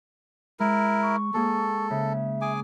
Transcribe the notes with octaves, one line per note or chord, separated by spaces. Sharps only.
G#3 E4 A#4
C#6
G#3 A#3 G#4 A4
C#3 E5
G#4 G#5 D6